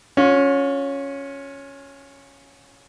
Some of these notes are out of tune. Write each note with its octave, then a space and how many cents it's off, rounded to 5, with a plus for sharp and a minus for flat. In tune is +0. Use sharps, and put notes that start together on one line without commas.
C#4 +0 F4 +40